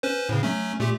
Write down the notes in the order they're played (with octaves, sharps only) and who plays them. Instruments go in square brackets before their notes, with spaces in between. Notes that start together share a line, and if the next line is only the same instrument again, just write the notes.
[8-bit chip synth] C#4 B4 C5
A2 C#3
F#3 A3 C#4
A#2 A3 G4